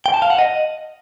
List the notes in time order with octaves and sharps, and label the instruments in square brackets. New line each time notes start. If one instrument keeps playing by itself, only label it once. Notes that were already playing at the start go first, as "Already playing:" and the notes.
[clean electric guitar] G5
A5
F5
F#5
D#5